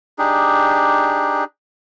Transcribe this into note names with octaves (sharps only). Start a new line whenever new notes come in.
D4 D#4 G4 G#4